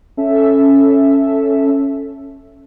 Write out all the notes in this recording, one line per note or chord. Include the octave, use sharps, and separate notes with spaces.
C#4 A4 E5